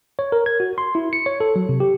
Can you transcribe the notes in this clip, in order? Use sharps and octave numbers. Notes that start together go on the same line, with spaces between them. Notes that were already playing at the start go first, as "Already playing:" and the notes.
C#5
A#4
G#6
F#4
C6
E4
C#7
C#5
A4
F#3
C3
G4